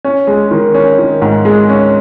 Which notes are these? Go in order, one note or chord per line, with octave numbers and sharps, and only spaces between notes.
C#4
G#3
D#3
C#4
D#3
G#2
G#3
C#4